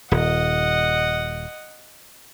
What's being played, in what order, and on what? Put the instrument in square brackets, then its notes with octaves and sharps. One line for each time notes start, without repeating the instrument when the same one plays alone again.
[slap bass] D#1 [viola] D#5 F#5